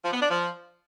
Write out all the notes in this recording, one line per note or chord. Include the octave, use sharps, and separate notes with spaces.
F3
B3
D4
F3